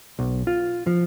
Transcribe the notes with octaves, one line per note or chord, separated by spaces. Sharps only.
B1
F4
F3